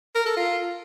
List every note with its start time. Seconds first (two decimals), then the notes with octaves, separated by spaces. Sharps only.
0.15 A#4
0.26 A4
0.37 F4